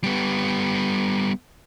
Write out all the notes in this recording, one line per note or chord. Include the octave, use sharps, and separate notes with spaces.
G3 B3